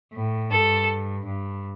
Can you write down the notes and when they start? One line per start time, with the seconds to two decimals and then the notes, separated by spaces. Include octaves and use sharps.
0.14 A2
0.51 G2 A4
1.26 G2